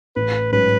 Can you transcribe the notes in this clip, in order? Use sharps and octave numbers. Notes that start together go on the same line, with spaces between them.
A1 B4
G#2 F#3 C#4 B4